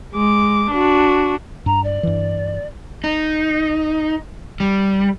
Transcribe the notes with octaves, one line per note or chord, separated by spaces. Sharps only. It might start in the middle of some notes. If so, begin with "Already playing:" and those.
G#3 D6
D4 F#4
G2 A#5
D5
G2 E3
D#4
G3